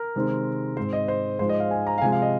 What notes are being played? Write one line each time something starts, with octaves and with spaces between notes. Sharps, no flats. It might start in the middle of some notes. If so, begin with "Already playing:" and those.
Already playing: A#4
C3 D#3 G#3 C4
G#2 G#3 C4 C5
D#5
C5
G#2 F3 G#3 C5
D#5
F5
G#5
A#5
F5
C3 F3 G#3 G#5
F5
D#5